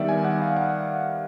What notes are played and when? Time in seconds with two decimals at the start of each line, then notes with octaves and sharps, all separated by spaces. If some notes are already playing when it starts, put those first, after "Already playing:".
Already playing: D#3 G3 B3 D5 E5
0.09 G#5
0.25 F#5
0.42 F5
0.57 F#5